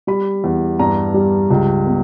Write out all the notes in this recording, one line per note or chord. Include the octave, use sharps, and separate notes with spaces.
G3 B5
E2
G2 A#5
G3
C#2
B3